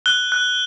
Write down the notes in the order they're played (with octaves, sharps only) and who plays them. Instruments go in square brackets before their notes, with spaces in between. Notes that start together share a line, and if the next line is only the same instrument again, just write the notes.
[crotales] F#6 G7
F#6